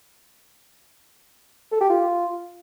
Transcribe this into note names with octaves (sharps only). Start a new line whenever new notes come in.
A4
G4
F4